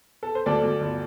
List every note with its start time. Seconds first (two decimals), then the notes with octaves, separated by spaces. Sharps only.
0.23 A4
0.35 C5
0.46 D2 A4 D5
0.63 D2
0.81 G1